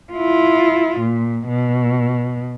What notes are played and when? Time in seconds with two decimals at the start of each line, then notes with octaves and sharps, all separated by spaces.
0.13 E4 F4
1.00 A#2
1.48 B2